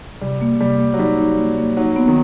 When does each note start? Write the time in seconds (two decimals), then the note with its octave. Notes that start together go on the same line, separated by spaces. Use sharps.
0.21 C3 G3
0.41 A#3
0.61 C3 G3
0.79 A#3
0.94 F#3
0.99 G3 D#4
1.19 D#4
1.39 A#3
1.58 A#3
1.77 F#3 D#4
1.96 B3
2.08 D#3